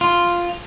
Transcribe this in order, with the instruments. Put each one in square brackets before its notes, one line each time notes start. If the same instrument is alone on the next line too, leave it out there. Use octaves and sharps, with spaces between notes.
[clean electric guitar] F4